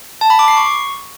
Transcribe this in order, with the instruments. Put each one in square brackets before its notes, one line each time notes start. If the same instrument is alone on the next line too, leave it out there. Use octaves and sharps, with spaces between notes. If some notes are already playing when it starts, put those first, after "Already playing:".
[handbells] A5
B5
D6
C7
C#6